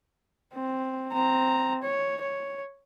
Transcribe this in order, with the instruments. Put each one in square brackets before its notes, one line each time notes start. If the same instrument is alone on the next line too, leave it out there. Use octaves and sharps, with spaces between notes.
[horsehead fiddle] C4
C4 A#5
C#5
C#5